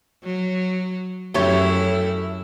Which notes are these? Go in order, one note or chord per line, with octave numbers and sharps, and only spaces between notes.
F#3
F#2 A3 E4 G4 C#5